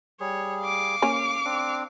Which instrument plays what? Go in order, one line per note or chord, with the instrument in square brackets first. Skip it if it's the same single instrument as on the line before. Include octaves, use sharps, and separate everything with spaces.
[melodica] G3 G#4 [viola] C#5
[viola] F5 D6
[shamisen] A#3 C#4
[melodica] C4 D4